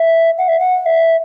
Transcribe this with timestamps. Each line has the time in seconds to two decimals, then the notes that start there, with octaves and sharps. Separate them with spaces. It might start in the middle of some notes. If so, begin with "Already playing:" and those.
Already playing: E5
0.38 F#5
0.48 E5
0.60 F#5
0.86 E5